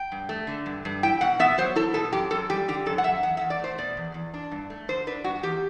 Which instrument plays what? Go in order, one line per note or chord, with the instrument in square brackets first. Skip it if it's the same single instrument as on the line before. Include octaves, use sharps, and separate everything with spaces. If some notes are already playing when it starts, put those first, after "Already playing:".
Already playing: [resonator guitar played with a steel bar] G5
G2
A3
D3
G2
G2
E4 G5
B2 F#5
B3 E5
F#3 C5
E4 A4
B2 A4
F#2 G4
F#2 A4
G3 G4
D3 G4
F#2 A4
F#5
F#2 E5
E2 F#5
E5
E2
D5
A3 C5
B2 D5
E2
E2
D4
G2
A3
D3 C5
D4 B4
G2 F#4
E2 G4